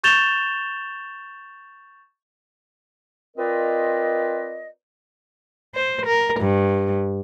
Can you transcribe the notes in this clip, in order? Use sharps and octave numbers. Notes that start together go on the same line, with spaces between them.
C#6 G6 A6 E7 F7 G7
C4 F4 A#4 B4 D5 D#5
C5
A#4
G2